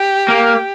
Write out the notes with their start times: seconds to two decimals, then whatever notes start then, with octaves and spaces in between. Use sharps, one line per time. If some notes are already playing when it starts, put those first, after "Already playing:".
Already playing: G4
0.28 A#3